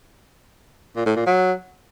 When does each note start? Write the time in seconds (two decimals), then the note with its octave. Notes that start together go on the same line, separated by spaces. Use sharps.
0.96 A#2
1.06 A2
1.16 A#2
1.26 F#3